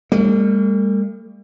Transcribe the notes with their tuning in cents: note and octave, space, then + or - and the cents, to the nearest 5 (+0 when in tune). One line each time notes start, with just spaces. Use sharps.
G3 +40 A#3 -45